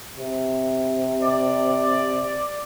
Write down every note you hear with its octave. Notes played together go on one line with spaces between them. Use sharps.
C3
D5